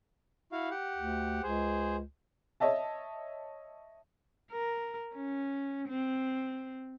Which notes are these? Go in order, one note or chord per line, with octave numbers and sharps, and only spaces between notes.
E4 F#4 F5
G4 F#5
D2
C#2 G#4 C5
C#5 D#5 E5 A5
A#4
C#4
C4